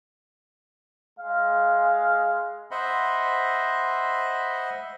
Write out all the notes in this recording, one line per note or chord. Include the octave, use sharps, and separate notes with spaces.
G#3 F5
C5 D#5 E5 F#5 B5 C6